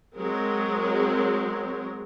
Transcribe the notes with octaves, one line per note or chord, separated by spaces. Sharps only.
F#3 G#3 C4 A#4